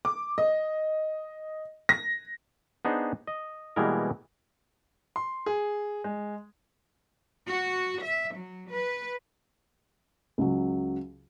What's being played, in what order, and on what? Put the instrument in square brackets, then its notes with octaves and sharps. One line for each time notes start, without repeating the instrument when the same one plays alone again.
[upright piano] D6
D#5
A#6
[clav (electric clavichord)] B3 D4 D#4 G#4 C5
D#5
B2 E3 G3 G#3 A#3 A#4
[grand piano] C6
G#4
G#3
[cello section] F#4
E5
F#3
B4
[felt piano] C#2 F#3